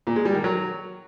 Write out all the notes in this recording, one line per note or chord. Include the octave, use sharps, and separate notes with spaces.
A#2
G#3
G3
D#3
F#3